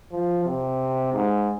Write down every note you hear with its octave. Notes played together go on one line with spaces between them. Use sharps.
F3
C3
G#2